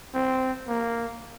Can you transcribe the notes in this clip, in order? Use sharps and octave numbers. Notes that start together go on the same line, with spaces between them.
C4
A#3